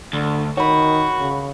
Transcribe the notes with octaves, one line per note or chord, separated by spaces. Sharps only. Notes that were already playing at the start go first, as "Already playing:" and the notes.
D2 D3
D#3 F#4 C#5 B5
C#3